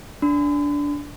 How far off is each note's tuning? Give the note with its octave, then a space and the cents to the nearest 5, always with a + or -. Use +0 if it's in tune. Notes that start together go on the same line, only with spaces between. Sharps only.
D4 -15 B5 +45